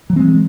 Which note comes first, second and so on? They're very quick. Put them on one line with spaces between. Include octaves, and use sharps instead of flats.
F#3 E3 C4 G#3